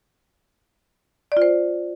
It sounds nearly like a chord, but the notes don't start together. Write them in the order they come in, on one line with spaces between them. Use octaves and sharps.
D5 F4 C5